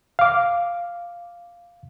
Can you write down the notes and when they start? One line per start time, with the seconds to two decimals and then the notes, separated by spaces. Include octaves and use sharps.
0.19 F5 D6